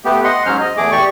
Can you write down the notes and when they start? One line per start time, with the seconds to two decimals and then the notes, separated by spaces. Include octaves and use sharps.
0.05 A3 B3 G4
0.24 D#5 F#5 C6
0.46 G#2 F#3 C#4 C5 F6
0.61 D#5
0.77 E2 A3 G#4 D6
0.92 G4 D5 C#6